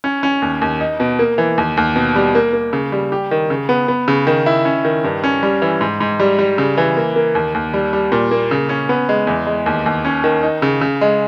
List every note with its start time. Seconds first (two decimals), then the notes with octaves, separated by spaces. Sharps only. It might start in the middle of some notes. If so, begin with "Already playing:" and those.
0.04 C#4
0.23 C#4
0.42 D#2
0.61 D#2
0.80 D#4
1.00 B2
1.19 A#3
1.38 E3
1.58 D#2
1.77 D#2
1.96 B2
2.16 G3
2.35 A#3
2.53 A#3
2.73 C#3
2.92 G3
3.12 G4
3.31 D#3
3.50 C#3
3.69 B3
3.88 B3
4.08 C#3
4.27 D#3
4.46 E4
4.65 C#4
4.85 D#3
5.04 G2
5.24 C#4
5.43 G3
5.62 E3
5.81 G#2
6.00 G#2
6.20 G3
6.39 G3
6.58 C#3
6.77 E3
6.97 A#3
7.16 A#3
7.35 D#2
7.54 D#2
7.74 G3
7.93 G3
8.12 A#2
8.31 A#3
8.51 C#3
8.69 C#4
8.89 B3
9.09 G#3
9.27 E2
9.47 G#3
9.66 D#2
9.86 D#2
10.05 C#4
10.24 D#3
10.43 D#4
10.62 C#3
10.81 C#3
11.01 G#3